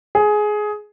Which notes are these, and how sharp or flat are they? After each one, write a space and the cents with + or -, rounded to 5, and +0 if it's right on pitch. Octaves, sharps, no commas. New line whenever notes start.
G#4 +15